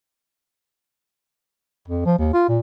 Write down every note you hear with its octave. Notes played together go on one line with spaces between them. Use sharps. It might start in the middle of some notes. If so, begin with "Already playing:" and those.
F2
F3
D#2
F4
A#2